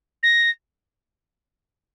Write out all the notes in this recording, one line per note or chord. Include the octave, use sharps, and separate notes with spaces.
A#6